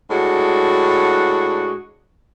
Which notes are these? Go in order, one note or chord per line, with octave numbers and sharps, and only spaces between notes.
A2 G#3 D4 F#4